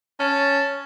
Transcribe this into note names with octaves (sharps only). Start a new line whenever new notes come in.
C#4 A5